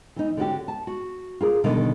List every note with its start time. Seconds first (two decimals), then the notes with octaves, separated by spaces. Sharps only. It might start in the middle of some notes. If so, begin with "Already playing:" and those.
0.16 E3 D#4
0.37 D3 C#4 F#4 G4
0.68 A5
0.87 F#4
1.41 F4 G#4 A#4
1.64 B2 D3 D#3 G3 A#4 D#5